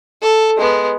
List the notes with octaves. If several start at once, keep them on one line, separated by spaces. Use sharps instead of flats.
A4
G#3 B3